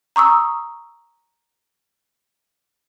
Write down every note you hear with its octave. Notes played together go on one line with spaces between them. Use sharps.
A#5 C#6 D#6 E6